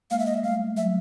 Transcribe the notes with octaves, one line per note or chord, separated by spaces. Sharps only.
G#3 A#3 F5
E5
D#5
E5
G3 A3 F5
F#3 G#3 E5